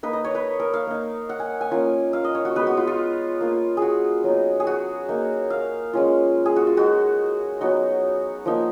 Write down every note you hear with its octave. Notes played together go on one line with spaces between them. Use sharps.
A#3 D#4 B4
D#5
C#5
B4
A#4
F5
A#3 D#4
F#5
G#5
G#5
A#3 C#4 F4
F5
D#5
C#5
F#4
G#3 B3 D#4 B4
F#4
F4
F4
A#3 F4
F#4 G#4
F#3 B3 D#4
G#4
F#4
A#3 D#4
F5
G#3 C#4 F4
G#4
F#4
F4
G#3 D#4 F#4
F#3 B3 D#4 F#4
F3 A#3 D#4